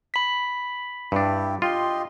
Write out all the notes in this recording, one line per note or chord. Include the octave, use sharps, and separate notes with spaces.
B5 B6
G2 D4 E4 G4
F4 G4 D#5 C6